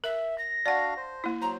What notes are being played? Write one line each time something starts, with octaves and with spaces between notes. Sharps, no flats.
A#4 E5
A#6
D4 F#4 D5 F5 F#5
C5
A#3 E4
F#3 C5 A#5